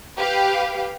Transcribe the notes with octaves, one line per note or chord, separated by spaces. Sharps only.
G4 B4 F5